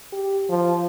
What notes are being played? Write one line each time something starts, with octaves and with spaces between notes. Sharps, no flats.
G4
F3